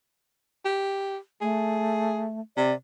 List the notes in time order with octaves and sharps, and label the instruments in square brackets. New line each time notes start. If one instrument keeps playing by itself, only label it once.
[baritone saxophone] G4
[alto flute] A3 [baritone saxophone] G#4
[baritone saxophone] C3 [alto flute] D5